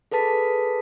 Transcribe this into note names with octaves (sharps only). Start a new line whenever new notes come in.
G#4 A4 B4 A5 B6